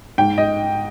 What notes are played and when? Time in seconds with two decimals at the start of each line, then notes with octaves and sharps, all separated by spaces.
0.18 G#2 G5
0.38 D#5